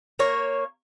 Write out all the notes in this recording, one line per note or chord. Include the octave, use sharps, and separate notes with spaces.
A#3 C#5